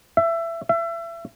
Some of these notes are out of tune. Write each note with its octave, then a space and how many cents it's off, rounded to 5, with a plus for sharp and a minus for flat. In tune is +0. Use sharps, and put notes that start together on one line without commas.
E5 +20
E5 +30